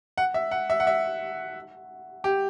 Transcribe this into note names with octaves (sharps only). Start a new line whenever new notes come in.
F#5
E5
F#5
E5
F#5
E5
G4